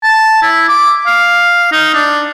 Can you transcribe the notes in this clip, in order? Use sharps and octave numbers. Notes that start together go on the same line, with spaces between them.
A5
E4
D6
F5
D#4
D4